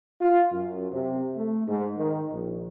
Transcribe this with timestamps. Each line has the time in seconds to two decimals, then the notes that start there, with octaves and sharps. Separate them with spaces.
0.21 F4
0.52 F#2
0.92 C3
1.36 A3
1.67 G#2
1.97 D#3
2.31 A#1